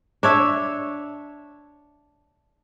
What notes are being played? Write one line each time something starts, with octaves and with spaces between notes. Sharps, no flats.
D4 C#5 E5